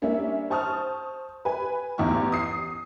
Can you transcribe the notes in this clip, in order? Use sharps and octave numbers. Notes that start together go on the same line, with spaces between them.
G3 A#3 C#4 D4 A#4 E5
C5 A5 C#6 D#6 F6
B4 G#5
A1 E2 D#4 G4 C#6
D#6 C7